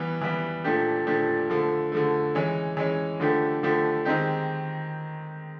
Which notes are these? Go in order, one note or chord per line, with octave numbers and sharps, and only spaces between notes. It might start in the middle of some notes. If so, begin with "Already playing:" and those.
Already playing: E3 G3 B3
E3 G3 B3
A#2 F3 A3 D4 G4
A#2 F3 A3 D4 G4
D3 F3 A3
D3 F3 A3
E3 G#3 C#4
E3 G#3 C#4
D3 F3 A3 D4 G4
D3 F3 A3 D4 G4
D#3 G#3 C4 D#4 G4